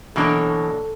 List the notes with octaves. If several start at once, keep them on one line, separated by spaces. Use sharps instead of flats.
B2 E3 F#3 A#3 D4 A4 C#5